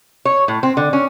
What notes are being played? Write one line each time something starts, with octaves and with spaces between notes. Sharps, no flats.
C#5
A2
C4
D3
C#4